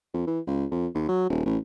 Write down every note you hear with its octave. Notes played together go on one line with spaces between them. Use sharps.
F2
E3
C#2
F2
D#2
F#3
D#1
A1